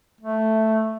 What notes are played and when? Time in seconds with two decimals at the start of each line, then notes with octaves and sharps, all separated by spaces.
0.21 A3